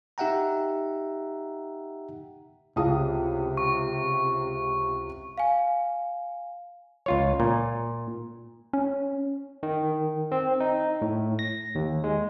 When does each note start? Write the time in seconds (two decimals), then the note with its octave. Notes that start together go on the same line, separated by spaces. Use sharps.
0.18 D#4 G4 E5 F#5 G5 A#5
2.76 C#2 C3 E4 G#4 F5 A5 D#6
3.57 C#6
5.38 F5 G#5
7.06 C#2 F4 C#5
7.40 A#2
8.73 C#4
9.63 D#3
10.32 C4
10.60 D#4
11.02 A2
11.39 A#6
11.75 D#2
12.04 G#3